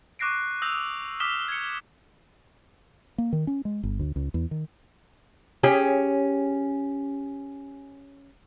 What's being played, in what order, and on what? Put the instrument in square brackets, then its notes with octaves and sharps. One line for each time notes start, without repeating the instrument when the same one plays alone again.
[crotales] C#6 D6 F#6 A#6 C7 D7
D#6 E6 G6 A#6 F7
D6 D#6 F6 B6 E7 G7
G#6 C#7
[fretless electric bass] A#3
D#3
C#4
G#3
G1
D2
C#2
E2
D#3
[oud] C#4 G4 G#4